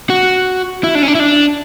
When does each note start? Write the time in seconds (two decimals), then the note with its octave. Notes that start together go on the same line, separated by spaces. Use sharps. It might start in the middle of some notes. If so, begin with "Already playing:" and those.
0.10 F#4
0.84 E4
0.95 D4
1.03 C#4
1.08 D4
1.15 E4
1.20 D4